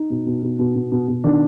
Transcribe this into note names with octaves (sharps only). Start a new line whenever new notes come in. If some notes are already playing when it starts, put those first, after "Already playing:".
Already playing: D#4
B2
B2
B2
B2
B2
B2
B2
D#3 D4